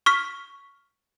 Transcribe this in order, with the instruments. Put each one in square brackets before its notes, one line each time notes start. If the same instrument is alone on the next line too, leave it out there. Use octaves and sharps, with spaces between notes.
[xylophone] C#6 F6 B6